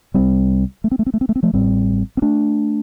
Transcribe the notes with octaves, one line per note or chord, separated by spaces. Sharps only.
C2 C3 G3 C4
A3
C4
A3
C4
A3
C4
A3
C4
F3 A3
A1 A2 G3 C4
C4
A3 D4